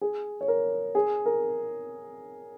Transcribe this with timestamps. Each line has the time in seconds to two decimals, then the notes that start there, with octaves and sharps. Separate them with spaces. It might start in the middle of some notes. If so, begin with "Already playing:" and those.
0.01 G#4
0.41 C#5
0.48 A#4
0.95 G#4
1.26 A#4